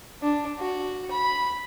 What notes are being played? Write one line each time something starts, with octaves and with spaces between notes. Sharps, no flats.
D4
F#4
B5